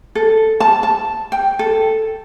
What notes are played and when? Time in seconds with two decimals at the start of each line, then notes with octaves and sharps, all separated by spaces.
0.15 A4
0.60 A5
0.83 A5
1.32 G5
1.59 A4